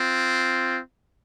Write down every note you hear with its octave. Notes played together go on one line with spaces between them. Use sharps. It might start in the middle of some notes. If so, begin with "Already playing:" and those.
Already playing: C4 F4